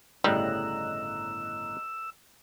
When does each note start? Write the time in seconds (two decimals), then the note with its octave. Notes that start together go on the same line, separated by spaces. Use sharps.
0.24 G1 A2 C#3 G3 D#5 A#5 E6 F#6